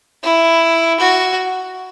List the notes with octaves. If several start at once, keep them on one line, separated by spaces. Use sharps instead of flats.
E4
F#4